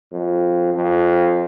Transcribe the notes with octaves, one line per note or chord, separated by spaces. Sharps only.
F2
F2